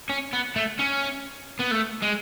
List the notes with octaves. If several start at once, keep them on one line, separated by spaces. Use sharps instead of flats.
C#4
B3
A3
C#4
B3
A3
G#3